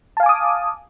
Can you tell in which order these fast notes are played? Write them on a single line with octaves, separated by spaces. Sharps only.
A5 F5 G#5 D6 D#6